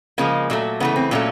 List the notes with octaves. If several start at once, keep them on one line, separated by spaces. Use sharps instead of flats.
C#3 F3 G#3 A#3
A#2 F#3 A3
C#3 E3 A3 B3
C4
A#2 F#3 A3 C#4